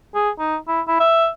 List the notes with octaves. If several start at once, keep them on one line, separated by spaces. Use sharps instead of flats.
G#4
D#4
E4
E4
E5